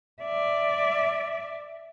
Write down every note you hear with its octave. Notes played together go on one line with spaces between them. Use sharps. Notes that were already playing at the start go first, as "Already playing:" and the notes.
D5 E5